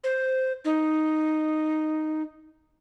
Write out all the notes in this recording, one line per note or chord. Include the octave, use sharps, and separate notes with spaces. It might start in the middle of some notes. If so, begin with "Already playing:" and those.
C5
D#4